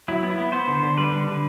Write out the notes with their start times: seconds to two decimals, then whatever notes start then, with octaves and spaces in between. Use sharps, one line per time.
0.08 F#3 E4
0.23 B3
0.30 E4
0.38 B3
0.52 B3 C5
0.68 D3
0.75 C5
0.83 D3
0.97 G3 B4
1.12 D3
1.27 D3